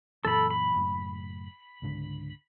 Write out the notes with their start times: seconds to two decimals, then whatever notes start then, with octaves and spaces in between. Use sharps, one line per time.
0.25 F#2 A#2 E3 A4 B5
0.50 B5
0.74 F#1 F#2 A2
1.82 C#2 G#2 D3